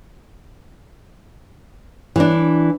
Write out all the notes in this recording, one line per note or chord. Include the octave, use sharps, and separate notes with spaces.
E3 D4